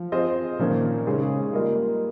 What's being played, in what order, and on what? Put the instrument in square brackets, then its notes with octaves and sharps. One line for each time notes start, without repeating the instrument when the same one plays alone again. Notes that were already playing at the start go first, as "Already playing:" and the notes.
Already playing: [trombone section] F3
[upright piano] C4 F4 G#4 C5 D#5
[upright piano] A#2 F3 A#3 C#4 [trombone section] D#3
[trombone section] C#3 [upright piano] G#3 D#4 G#4
[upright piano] G3 A#3 F4 A#4 D#5